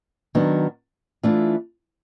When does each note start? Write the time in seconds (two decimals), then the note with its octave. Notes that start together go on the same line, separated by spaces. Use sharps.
0.35 D#3 F#3 B3 D4
1.23 E3 A3 D4 F4